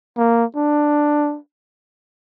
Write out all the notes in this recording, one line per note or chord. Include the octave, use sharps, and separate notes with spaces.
A#3
D4